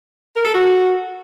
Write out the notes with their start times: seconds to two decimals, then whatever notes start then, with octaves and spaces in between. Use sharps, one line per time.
0.36 A#4
0.45 A4
0.54 F#4